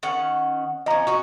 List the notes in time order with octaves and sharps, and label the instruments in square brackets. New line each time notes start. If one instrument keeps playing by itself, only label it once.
[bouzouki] D#3 C#4 F#5
[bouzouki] F3 C#4 [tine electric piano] D#5 A#5
[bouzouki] C#4 D#4 F#4